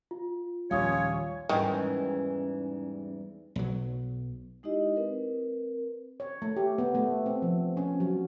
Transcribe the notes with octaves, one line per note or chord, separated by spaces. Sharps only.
F4
A#1 D#2 G3 C#4 F4 C#5 F5 D#6
E2 G#2 D#3 E3 G3 C#4
B1 F#3
G#3 D#4 E4 G4 D#5
C4 A#4 B4
C#5
A3
G4
B3
A3
C4
F3
C#4
F#3